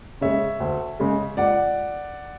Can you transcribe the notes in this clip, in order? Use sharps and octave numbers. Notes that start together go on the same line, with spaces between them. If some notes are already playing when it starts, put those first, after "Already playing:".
C#3 G#3 C#5 E5
D2
C#3 G#3
C#2 D5 F#5